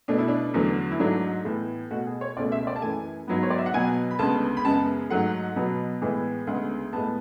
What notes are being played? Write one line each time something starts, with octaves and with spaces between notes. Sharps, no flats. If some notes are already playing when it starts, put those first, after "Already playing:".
B2 A3 D4
E4
D4
E2 D3 F#3 A3
E4
G#2 F#3 A3 D4
A2 E3 B3
B2 A3 F#4
G#4
C#5
C#2 B2 A3 D5
E5
D5
A5
F#2 E3 A3 G#5
G#2 F#3 B3
C#5
D5
E5
F#5
B2 F#3 B3 G#5
B5
D2 C#3 G#3 B3 A5
B5
F#2 C#3 G#3 B3 A5
G#2 F#3 A3 F#5
B2 F#3 B3
A2 E3 G#3 B3
D2 C#3 G#3 B3 F#5
A2 G#3 B3 A5